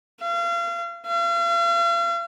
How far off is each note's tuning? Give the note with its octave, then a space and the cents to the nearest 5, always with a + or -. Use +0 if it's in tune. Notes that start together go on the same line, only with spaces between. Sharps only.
F5 -35
F5 -40